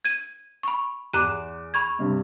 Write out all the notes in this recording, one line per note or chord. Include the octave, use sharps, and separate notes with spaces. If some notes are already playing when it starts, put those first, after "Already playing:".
G#6 D#7
B5 C#6
E2 A#5 D6 F#6 D#7
B5 C#6 G#6
G2 C3